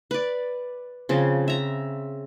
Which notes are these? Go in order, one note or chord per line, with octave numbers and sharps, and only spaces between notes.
B4 D5
C#3 F3 C4
E5 A#5